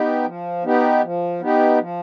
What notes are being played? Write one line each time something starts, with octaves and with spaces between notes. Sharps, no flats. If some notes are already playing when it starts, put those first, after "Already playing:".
Already playing: B3 D#4 G4
F3
B3 D#4 G4
F3
B3 D#4 G4
F3